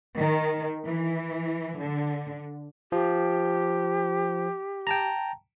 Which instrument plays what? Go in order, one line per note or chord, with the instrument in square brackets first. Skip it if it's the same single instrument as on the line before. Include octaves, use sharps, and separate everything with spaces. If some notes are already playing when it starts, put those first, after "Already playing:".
[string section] D#3
E3
D3
[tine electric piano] F3 [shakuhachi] G4
[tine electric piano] G5 A5 A#5